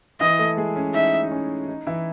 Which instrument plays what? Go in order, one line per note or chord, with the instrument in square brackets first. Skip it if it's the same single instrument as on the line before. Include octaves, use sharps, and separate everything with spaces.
[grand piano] E3 E4 [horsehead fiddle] D#5
[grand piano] A3 A4
G#3 G#4
C#4
[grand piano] D#4 [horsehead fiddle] E5
[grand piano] D#4
C#4
D#4
E3 E4